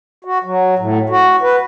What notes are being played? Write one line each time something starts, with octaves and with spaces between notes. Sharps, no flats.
F#4
F#3
A2
F#4
B4